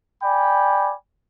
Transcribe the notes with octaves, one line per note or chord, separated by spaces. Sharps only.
D5 G5 G#5 B5